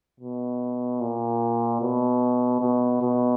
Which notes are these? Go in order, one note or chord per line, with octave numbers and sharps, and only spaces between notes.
B2
A#2
B2
B2
B2